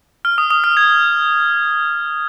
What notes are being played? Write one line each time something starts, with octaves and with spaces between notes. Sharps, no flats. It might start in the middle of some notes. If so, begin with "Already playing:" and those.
F6
D#6
D#6
F6
G#6